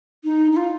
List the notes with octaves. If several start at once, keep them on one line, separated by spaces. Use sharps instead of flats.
D#4
D#4
F4